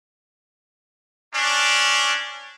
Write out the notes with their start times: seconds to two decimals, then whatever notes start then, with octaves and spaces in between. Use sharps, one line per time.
1.34 C#4 D4